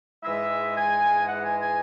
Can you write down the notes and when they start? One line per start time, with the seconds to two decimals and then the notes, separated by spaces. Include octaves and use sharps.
0.24 G#2 E3 G#3 E5
0.75 G#5
1.26 F#5
1.43 G#5
1.60 G#5